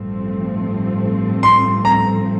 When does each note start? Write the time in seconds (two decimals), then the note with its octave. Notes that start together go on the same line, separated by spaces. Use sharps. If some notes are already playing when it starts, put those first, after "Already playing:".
Already playing: A1 G2 F3 A3 C4
1.43 C6
1.85 A#5